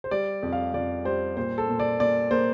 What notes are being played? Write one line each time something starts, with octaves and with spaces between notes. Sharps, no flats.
C5
G3 D5
F2
F5
F2 D5
G3 C5
A#2 C5
A4
A#2
D5
A#2 D5
A#3 C5